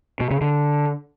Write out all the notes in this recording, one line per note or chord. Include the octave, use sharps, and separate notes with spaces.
B2
C#3
D3